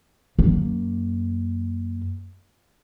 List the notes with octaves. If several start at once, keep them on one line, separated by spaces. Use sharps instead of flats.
F#2 A#3